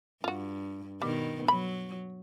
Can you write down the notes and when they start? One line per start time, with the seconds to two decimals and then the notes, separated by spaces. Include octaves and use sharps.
0.24 G2 F4 F#4
1.02 B2 D#3 G3 B3
1.48 F#3 B5